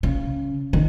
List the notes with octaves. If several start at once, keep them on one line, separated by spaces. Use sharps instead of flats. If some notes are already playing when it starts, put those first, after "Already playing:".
C#3
D#3